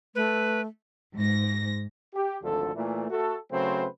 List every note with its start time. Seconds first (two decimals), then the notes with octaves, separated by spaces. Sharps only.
0.15 A3 B4
1.15 G#2 A#6
2.14 G4
2.43 G#1 D2 D3 F3 A4
2.75 A#2 E3 A3
3.10 A3 F#4 A4
3.52 C#3 F#3 A3 C4 B4 C5